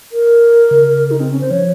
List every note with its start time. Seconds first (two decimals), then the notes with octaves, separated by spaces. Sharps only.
0.12 A#4
0.71 C#3
1.11 D#4
1.20 C4
1.31 C#4
1.41 C5
1.51 F3 C#5